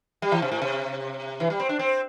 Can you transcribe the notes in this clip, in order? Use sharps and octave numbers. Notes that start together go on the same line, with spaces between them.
G3
E3
C3
A2
C3
E3
G3
C4
D4
C4